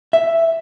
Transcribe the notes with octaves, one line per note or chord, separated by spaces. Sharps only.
E5